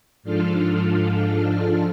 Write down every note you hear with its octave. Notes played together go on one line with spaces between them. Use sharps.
G#2 F3 D4 F4 A4 F6